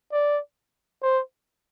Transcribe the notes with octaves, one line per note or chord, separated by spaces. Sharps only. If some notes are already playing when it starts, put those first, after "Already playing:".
D5
C5